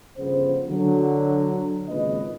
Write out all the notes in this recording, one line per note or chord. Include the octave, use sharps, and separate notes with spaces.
G1 C#3 F3 B3 C5
D3 F#3
G#1 A#2 C#3 B4 D#5